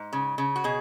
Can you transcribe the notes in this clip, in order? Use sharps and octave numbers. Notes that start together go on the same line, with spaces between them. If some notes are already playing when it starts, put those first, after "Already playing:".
Already playing: G#2
C#3
C#3
F#4
B2 G#4